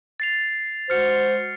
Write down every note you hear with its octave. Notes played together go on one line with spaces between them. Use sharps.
A6 C7 F7
G#3 F#4 C5 F6 C#7